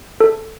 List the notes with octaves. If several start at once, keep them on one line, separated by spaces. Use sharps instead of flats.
A4